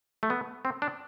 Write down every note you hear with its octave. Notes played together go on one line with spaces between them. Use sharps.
A3
B3
C4
D4